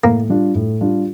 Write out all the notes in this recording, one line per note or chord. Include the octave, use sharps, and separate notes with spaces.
A2 A#3
G3 D4 F4
A2
G3 D4 F4